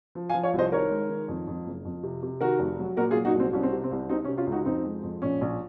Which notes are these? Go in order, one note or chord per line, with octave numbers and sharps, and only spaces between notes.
F3
F5 G#5
F3
C#5 F5
C2
C5 D#5
D#3 A#4 C#5
G#3
D#3
F2
F2
F#1
F2
C3
C3
D#3 F#4 A#4
F1
F#3
A#2 F#4 A#4
F4 G#4
F#3
D#4 F#4
C2
C4
C2 C#4
C4
C3
C4
C2
C3 C4 D#4
C#4
C3
C#4 F4
C#2
D#4 F#4
F2 C4 D#4
G#3
F2
A#1 C#4
A#1